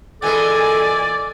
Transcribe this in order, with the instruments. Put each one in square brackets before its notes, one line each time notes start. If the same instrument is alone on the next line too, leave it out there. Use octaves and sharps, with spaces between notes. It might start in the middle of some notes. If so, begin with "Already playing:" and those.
[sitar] A#2 E3 G#3 [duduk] A4 [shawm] D5 [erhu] G#5